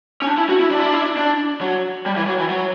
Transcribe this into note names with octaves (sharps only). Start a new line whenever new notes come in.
C#4
D4
E4
F#4
E4
D4
E4
D4
E4
D4
D4
F#3
G3
E3
F#3
E3
F#3